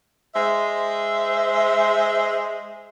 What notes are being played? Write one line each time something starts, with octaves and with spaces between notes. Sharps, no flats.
G#3 C5 E5